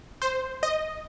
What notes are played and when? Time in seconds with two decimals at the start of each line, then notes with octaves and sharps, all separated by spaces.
0.22 C5
0.63 D#5